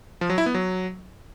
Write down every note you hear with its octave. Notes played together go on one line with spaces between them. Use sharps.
F3
F#3
E4
B3
F#3